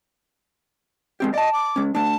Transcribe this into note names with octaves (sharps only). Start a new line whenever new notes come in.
G#3 C4 G4
D5 D#5 A5
D6
G#3 C#4
A3 D4 A5